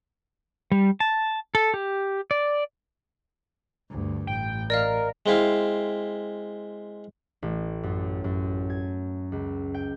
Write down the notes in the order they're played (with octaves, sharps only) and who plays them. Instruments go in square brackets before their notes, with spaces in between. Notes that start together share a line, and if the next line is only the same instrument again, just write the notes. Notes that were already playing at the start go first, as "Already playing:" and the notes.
[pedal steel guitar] G3
A5
A4
G4
D5
[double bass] D2 G2
[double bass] A1 [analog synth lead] G5
[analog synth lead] A#4 [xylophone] D5 D#5 F5
[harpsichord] G#3 C4 E4 F5
[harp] A1
F#2
F#2
G#6
C#2
G5